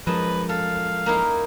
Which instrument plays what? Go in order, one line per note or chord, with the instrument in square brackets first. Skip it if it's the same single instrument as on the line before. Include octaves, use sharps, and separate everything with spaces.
[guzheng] F#2 D#5 A5 [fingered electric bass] F3 G#3 [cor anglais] B4
[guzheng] A4 [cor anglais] F5
[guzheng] A#3 D#4 E4